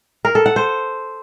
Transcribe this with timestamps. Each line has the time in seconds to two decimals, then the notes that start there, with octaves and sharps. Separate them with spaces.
0.25 A#4
0.35 A4
0.46 F#5
0.56 C5